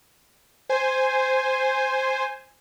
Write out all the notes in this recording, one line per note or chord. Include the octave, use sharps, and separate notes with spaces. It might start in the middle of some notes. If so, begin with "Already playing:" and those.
C5 G#5